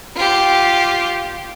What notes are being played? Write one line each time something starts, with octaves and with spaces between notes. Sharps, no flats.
F4 G4